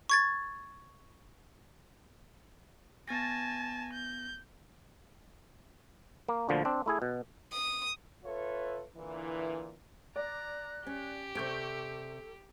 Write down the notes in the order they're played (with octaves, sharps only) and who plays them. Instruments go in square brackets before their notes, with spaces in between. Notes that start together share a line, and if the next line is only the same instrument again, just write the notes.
[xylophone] C#6 G#6 A6
[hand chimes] B3 A6 A#6 [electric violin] G#5 A5
[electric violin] G6
[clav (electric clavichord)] A#3
D2 A#2 D3 F3
C4 D4
A3 E4 G#4
B2
[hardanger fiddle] D#6
[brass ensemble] F4 A4 B4 C#5 E5
A#2 D3 E3
[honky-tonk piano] D5 [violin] A#5 [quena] F#6
[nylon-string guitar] C#4 [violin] G4
[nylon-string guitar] C3 D5 [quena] A4 [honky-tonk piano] C#6 G6 D7